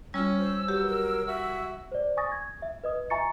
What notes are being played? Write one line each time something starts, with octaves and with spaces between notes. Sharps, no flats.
G3 C#4 F4 C#5 E6
C5
F#3 G4 B4
A#4
F#4 E5
C5 D5
G#5 C#6 D#6 A6 A#6
G#6
E5
B4 D#5 D#6
E5 G#5 A#5 C#6 A6 C#7